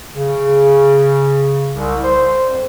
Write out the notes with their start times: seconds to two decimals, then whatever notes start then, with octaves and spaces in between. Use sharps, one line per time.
0.16 C#3
1.75 C2
2.04 C5
2.49 F2